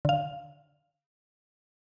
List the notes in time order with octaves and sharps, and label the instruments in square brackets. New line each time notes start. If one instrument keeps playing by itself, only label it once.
[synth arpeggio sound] D3 F5